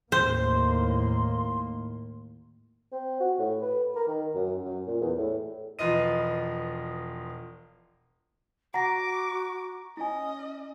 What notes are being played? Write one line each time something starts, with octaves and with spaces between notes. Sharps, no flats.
D#2 A2 A#3 C5 C6
C4
F#4
A2
B4
A#4
D#3
F#2
F#2
A#2
E2
A2
E1 F3 F4 B4 D#5 D#7
F#4 F#5 A#5 D6 A#6
C#4 E4 D#5 G#5